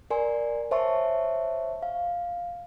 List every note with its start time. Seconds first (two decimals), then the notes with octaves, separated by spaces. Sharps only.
0.11 A#4 D5 G#5 C6
0.71 C5 C#5 E5 A5 C6 C#6
1.83 F5